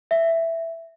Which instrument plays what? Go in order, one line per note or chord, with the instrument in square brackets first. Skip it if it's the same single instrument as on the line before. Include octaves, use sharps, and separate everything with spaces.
[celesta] E5